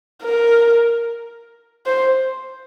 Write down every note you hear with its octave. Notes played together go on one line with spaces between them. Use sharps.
A#4
C5